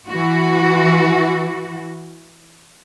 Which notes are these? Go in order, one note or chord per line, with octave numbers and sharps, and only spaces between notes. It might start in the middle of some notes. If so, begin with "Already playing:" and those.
E3 F#4